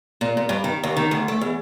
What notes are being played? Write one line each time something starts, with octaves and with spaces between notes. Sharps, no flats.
A#2
A#2
G2
D#3
D#2
D#3
D2
A3
E2